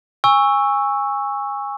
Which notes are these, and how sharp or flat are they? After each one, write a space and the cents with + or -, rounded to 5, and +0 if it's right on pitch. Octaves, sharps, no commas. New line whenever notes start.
G#5 -25 C#6 +0 E6 +0